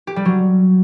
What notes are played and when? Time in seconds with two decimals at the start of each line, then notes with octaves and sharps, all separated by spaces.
0.07 G4
0.16 G3
0.25 F#3